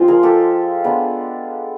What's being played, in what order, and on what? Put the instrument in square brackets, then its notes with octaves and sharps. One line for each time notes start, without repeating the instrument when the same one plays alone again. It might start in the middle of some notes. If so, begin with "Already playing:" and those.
Already playing: [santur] F3 G#3 C4 F4 C5
G#4 A#4
G4 A4
G#3 B3 D4